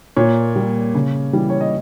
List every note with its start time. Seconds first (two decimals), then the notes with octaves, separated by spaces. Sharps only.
0.16 A#2 C#5
0.56 G3
0.95 C#3
1.33 E3 G3
1.50 C#5
1.61 D#5